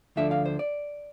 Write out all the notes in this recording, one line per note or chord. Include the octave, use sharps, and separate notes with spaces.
D2 D3 F3 A3 D4 E5
F5
C5
D5